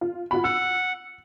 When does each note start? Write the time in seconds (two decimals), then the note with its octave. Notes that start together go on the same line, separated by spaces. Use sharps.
0.01 F4
0.31 F4 F#4 B5
0.44 F#5 E6